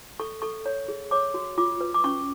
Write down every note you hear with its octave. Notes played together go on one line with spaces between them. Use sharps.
A4 C#6
A4 C#6
C#5
G#4
C#5 D6
F#4
F4 D6
B4
D6
C#4 C#6